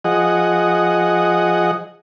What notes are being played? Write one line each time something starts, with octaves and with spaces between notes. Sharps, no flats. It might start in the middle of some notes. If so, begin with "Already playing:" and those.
F3 G#4 D#5 F#5